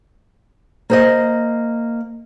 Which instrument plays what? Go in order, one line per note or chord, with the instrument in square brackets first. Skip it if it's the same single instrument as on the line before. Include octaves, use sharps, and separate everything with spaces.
[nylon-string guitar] A#3 C5 D#5